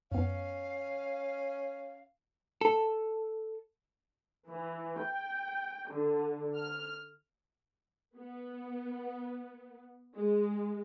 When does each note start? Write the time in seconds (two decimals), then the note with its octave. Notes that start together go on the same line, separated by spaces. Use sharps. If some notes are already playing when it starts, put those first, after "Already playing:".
0.11 F#2 B3 C#4 F5
2.61 A4
4.49 E3
5.01 G5
5.90 D3
6.56 F6
8.16 B3
10.15 G#3